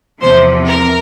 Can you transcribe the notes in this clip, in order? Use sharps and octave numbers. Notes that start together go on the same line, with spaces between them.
E2 C3 F3 C5
A#4